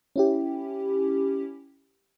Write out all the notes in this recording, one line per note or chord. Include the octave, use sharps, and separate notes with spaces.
C#4 E4 G4